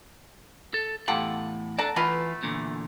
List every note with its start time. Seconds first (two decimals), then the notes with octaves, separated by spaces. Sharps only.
0.74 A4
1.08 E2 A2 F4 G4 A4 F#5
1.78 A4 D5 F#5 A5 A#5
1.96 E3 A3 B3 F4 B4
2.43 E2 A#2 D3